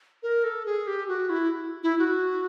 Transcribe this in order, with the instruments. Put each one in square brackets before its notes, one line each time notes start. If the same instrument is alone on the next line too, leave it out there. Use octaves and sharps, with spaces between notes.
[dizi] A#4
A4
G#4
G4
F#4
E4
E4
F#4